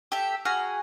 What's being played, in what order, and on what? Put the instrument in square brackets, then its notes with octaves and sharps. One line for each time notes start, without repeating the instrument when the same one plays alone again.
[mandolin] G4 A4 E5
F#4 G#4 A#5 F6